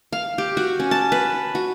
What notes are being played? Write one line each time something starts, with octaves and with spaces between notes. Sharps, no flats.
F5
G4
F#4
C#4
A5
B4
F#4